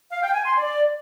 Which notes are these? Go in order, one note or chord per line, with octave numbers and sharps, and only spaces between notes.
F5
G5
G#5
C6
D5